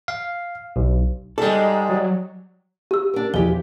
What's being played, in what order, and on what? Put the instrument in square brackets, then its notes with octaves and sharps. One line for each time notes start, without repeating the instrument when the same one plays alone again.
[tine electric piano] F5
B1
[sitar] G#2 G#3 [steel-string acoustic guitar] G3 D5 [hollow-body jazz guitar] A4
[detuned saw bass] F#3
[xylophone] G4 E6
[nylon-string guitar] D4 A#4
[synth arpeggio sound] E2 B2 F3 [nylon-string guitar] E4 G4 G#4 [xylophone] G7